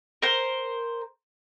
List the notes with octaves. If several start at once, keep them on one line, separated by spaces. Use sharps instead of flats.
A#4 C5